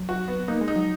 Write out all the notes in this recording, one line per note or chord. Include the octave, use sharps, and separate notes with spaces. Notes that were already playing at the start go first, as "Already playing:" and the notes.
Already playing: F#3
F#4
B3
A#3 D#4
G#3
D#4
F#3